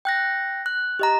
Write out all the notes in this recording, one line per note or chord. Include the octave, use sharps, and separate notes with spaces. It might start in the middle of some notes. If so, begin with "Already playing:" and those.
G5 F#6 A#6
F#6
G4 D#5 A#5